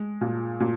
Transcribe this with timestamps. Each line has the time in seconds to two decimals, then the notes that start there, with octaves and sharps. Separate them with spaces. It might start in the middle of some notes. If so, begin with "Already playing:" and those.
Already playing: G#3
0.21 A#2
0.60 A#2